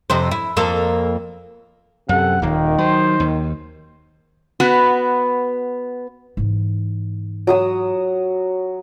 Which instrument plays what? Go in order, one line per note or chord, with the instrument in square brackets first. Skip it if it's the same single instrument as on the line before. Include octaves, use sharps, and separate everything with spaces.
[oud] F2 C3 C5
E4
F2 A#3 A4
[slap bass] F#2 [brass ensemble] C3 A4 [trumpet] F#5
[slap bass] D#1 D#2 [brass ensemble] D#3 [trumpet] A#3
[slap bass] F#3 [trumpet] C5
[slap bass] D#2
[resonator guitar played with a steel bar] B3 F#4 B4
[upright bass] G#2 E3
[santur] F#3 D#6 E6